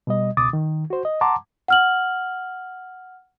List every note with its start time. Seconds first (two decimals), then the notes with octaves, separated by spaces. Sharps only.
0.07 B2 G3 D#5
0.37 C#2 B2 D6 D#6 A6
0.53 D#3
0.90 F#4 C5
1.05 D#5
1.21 F#5 A5 A#5 C6 D6
1.68 F#5 F6 F#7